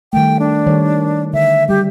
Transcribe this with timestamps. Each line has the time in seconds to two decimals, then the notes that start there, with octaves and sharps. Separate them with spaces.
0.13 D#3 G3 A3 G5
0.40 D4
0.66 D#3 G3 C#5
1.33 D3 E5
1.69 G3 G4